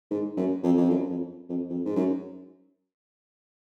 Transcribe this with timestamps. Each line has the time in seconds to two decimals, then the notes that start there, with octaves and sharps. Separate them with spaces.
0.11 G#2
0.37 F#2
0.63 F2
0.77 F2
0.90 F#2
1.09 F2
1.49 F2
1.70 F2
1.85 G#2
1.96 F#2